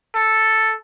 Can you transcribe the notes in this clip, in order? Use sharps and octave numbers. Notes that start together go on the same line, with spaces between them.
A4